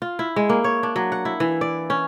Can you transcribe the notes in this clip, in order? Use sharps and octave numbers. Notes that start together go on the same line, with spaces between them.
F4
E4
G#3
A#3
C#5
D4
F#3
F#5
E4
E3
D5
C#4